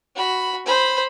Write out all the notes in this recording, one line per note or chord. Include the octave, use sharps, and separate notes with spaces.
F#4 B5
C5 B5